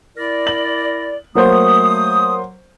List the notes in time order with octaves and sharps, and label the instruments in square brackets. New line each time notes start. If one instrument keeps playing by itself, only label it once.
[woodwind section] E4 A#4 D5
[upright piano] F#7
[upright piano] F#3 A#3 C5 [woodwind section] A3 D#6